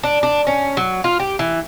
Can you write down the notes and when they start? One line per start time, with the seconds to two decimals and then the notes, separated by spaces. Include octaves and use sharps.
0.03 D4
0.23 D4
0.47 C#4
0.77 F#3
1.04 F4
1.20 G4
1.39 E3